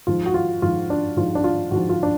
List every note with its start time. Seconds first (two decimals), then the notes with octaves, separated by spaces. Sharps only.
0.07 G#2 F3 F4
0.26 F#4
0.34 F4
0.62 G#2 F3 F4
0.90 D4
1.17 G#2 F3 F4
1.35 D4
1.44 F4
1.71 G#2 F3 F#4
1.89 F4
2.03 D4